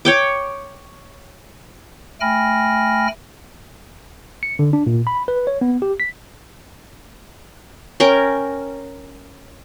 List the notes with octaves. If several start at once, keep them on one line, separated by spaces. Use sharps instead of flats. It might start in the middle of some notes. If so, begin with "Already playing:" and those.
C#5 G5 D6
A3 G5 G#5 B5 F6 A#6
C#7
D3
D4
A#2
B5
B4
C#5
B3
G4
B6
C#4 A#4 G5